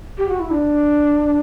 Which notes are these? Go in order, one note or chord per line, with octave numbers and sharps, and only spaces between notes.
G4
F#4
E4
D4